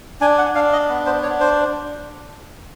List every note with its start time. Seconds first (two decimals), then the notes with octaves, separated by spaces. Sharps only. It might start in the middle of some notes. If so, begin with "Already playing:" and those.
0.21 D4 G#5
0.38 F#5
0.55 D4 F5
0.73 D#5
0.89 B3
1.06 C5
1.23 D4 C#5
1.40 C5